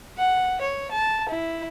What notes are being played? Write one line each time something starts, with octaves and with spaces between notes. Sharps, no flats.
F#5
C#5
A5
E4